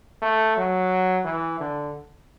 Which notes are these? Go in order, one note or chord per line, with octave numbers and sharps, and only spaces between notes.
A3
F#3
E3
D3